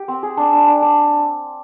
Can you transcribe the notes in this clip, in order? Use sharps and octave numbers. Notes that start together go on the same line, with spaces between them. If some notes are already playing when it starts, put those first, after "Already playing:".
Already playing: G4
C4
G#4
D4
D4
D4
D4